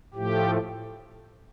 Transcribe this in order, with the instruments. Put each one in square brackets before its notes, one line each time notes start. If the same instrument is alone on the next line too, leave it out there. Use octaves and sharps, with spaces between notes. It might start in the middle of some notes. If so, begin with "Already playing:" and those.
[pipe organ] A2 F3 A3 G4